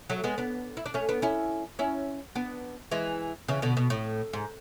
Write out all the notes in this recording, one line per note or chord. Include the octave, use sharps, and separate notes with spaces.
F#3 A3
G#3 B3
B3 D4
E4
D4
A3 C#4
B3 D4
C#4 E4
C#4 E4
B3 D4
E3 G#3
C#3 E3
B2 D3
B2
A2
G#2